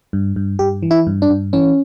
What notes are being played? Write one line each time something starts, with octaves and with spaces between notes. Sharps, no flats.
G2
G2
G2 G4
E3
E4
G2
D4
G2
E3 C#4